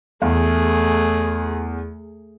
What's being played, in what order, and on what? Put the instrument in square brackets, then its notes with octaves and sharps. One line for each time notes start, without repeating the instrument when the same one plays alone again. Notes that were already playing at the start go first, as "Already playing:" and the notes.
[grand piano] E2 [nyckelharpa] A3 G#4